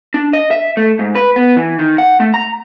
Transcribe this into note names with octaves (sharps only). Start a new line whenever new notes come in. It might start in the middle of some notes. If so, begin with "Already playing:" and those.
D4
D#5
E5
A3
G#2
B4
B3
E3
D#3
F#5
A3
A#5